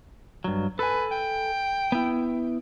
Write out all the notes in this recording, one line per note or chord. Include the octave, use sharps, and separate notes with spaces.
G2 F#3
A4 B4 G#5
G5
B3 E4